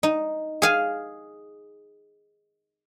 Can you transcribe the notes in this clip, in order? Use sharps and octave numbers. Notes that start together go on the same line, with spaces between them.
D#4
G#4 F5 G#5